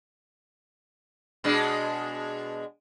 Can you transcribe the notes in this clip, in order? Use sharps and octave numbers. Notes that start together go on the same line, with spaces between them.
B2 G#3 D4